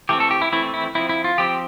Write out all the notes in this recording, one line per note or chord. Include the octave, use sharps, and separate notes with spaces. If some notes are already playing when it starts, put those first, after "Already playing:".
E3 A3 C4 G4
A4
G4
E4
E3 A3 C4 E4
E4
F3 C4 E4
E4
F4
F3 C4 G4